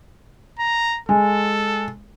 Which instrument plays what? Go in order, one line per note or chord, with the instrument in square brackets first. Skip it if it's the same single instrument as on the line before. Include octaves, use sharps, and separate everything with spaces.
[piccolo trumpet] A#5
[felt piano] G#3 [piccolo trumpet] A4